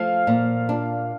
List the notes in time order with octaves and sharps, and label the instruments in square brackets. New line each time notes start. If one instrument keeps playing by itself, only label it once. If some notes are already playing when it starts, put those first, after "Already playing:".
Already playing: [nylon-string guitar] F3 A3 [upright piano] F5
[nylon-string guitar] A#2
D4